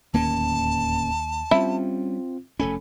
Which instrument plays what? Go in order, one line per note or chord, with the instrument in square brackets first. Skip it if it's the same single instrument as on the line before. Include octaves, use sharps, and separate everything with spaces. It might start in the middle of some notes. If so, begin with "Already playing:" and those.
[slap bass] D1 A#3 C#4 [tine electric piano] D#2 [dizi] A5
[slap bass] G3 C#4 [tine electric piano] C4 F4 [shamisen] E4
[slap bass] F1 A3 C#4 [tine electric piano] A4 G#5 B5